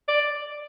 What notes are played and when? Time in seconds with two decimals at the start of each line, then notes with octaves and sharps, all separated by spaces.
0.09 D5